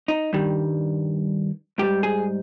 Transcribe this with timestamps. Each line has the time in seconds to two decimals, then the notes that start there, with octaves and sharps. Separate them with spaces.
0.08 D#4
0.33 G2 D#3 G3
1.78 G#2 G3 G4
2.03 G#4